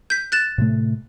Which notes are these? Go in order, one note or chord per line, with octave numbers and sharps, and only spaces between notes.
G6 B6
F#6 A6 E7
A2 C3 A3